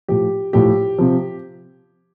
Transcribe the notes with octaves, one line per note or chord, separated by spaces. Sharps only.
A2 F3 G4
A2 F3 G4
C3 F3